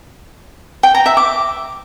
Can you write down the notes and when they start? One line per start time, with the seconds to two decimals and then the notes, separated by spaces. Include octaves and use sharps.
0.83 G5
0.95 A#5
1.06 E5
1.17 D6